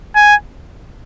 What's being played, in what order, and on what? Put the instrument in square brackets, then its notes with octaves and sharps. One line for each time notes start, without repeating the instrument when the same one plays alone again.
[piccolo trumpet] G#5